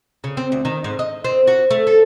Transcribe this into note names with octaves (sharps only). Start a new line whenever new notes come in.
C#3
C4
D2
D#3
G#2
D#5
C4
F#4
A3
A4